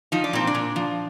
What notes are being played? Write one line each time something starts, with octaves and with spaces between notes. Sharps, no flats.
F3 D#4
D4
A#2 C4
D4
A#2
F3